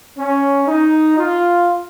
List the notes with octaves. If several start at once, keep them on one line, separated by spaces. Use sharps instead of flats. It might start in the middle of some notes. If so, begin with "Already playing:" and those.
C#4
D#4
F4